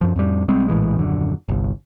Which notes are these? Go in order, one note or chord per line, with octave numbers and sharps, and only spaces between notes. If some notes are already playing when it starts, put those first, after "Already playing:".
F#2 F3
F2 A2 G3
B1 G3 G#3 C4
A#1 A2 E3 G#3
D#1 F#2 D3
G1 C2